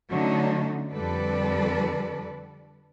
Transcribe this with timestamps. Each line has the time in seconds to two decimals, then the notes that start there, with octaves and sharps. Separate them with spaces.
0.11 D3 F#3 A3 C#4 D#4
0.92 F2 D3 G3 A4 B4 D5